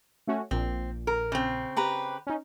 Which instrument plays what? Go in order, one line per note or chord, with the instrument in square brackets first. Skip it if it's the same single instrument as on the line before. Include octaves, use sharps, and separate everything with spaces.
[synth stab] A3 C#4 F#4
[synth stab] A#1 A#2 [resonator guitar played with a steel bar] C4
[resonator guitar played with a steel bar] A#4
C#3 C4
[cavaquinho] G4 B4 A#5
[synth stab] C#4 D#4